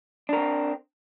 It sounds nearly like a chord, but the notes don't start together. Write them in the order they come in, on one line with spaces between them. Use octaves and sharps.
D4 A#4 C4